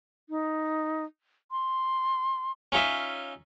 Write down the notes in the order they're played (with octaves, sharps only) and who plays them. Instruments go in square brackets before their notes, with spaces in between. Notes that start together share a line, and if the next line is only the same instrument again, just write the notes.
[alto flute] D#4
C6
[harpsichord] C#4 D#4 F4 E5